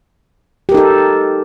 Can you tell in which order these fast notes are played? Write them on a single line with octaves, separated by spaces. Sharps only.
G4 A#4 D#4 A4